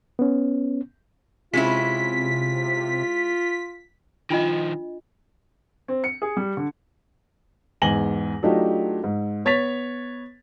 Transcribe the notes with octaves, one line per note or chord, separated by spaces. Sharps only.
B3 C#4
C3 G#3 C#4 E4 F4 B6
D#3 F3 D4 F4 D#5
C4
C#7
G#4
G3
D3
E2 G#2 G#5 A#6 F#7 G7
F#3 A3 D4 D#4 F4 G4
G#2
B3 C#5 A6 B6 F7